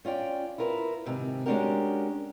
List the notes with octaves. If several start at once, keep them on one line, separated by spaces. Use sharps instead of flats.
C#4 F4 D5 G5
E4 F4 A#4 B4
G#2 C3 D#3 C4
G#3 C#4 D4 F#4 G4 A#4